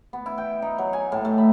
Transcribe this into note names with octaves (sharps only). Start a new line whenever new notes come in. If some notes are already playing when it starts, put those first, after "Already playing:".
B3
E4
G5
D#4
F#3
G#5
A2
A3
B5